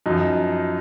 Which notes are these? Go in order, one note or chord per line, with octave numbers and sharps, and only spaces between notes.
F#2 F3 D#4